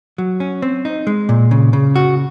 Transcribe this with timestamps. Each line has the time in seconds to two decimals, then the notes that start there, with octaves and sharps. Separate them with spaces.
0.18 F#3
0.40 C#4
0.62 C4
0.85 D#4
1.07 G#3
1.29 A#2
1.51 C#3
1.73 C#3
1.96 F#4